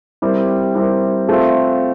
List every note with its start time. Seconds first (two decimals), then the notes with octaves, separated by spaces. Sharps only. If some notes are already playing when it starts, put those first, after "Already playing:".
0.22 G3 C4 E4 G4 A#4
0.75 G3 C4 E4 G4 A#4
1.28 A3 C4 F4 A4